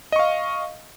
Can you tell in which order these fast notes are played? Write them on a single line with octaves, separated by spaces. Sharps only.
D#5 C#6 F5